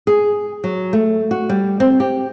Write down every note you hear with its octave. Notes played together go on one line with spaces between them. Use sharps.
G#4
F#3
A3
F#4
G3
C4
G4